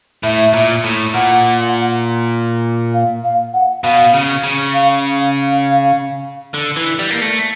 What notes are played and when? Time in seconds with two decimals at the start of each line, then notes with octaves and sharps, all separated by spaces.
0.23 A2 E5
0.53 A#2
0.84 A2
1.14 A#2 F#5
2.94 F5
3.24 F5
3.54 F#5
3.84 B2 F5
4.14 C#3
4.44 C#3
4.74 F5
5.19 F5
6.54 D3
6.76 E3
6.99 G3
7.10 A#3
7.22 A3